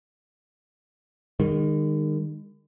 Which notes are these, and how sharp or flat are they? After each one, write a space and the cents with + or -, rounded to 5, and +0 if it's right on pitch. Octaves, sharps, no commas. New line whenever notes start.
D#3 -25 G#3 -45